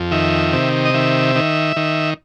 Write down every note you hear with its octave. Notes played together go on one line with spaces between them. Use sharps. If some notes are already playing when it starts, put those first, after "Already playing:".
Already playing: F2
D#3 E5
C3
D#5
D#3 E5
D#3
D#3